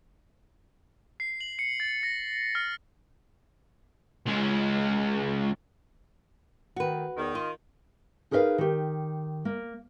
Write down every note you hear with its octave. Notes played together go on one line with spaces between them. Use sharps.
C7
F#7
C#7
A6
A#6
F6
C#2 G#3
D#3 F#4 B4
E2 D#3
F4 D#5
D#4 G#4 A#4 B4 E5 F5
D#3 G4
A#3